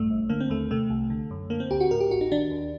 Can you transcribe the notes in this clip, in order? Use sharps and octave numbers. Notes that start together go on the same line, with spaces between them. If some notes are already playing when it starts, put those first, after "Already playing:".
Already playing: A#1 G2 A3
G1
D3 A#3
C4
D#2 A3
C3 A3
C2
D3
F#2
D3 A#3
C4
D2 G4
F#4
A2 A#4
G4
A1 F#4
D#4
D#3 D4
D#2